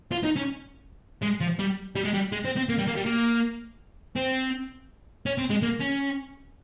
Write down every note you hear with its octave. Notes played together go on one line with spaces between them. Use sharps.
F4
D#4
C#4
G#3
F3
G3
G3
G#3
G3
G#3
C4
C4
A#3
G3
A#3
G3
A#3
C4
C#4
C4
G#3
A#3
C#4